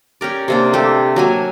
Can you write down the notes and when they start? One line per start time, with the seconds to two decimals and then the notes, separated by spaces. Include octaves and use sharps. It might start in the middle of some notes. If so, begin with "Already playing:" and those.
0.21 C#4 G4 A#4 D5
0.48 C3 A#3 D4
0.74 A3 G4
1.16 F#3 A#3 G#5